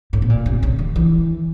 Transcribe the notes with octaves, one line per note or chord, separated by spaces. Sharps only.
A2
B2
A#2
C3
C#3
D#3
E3